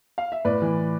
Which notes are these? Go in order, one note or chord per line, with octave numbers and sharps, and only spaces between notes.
F5
E5
A2 B4 D5
E3